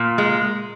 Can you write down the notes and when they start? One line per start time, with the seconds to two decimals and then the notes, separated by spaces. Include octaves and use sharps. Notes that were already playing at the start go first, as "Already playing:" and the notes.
Already playing: A#2
0.18 G#3